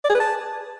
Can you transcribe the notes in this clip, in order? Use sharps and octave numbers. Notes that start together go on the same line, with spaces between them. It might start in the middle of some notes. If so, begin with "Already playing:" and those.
D5
G#4
B4
A5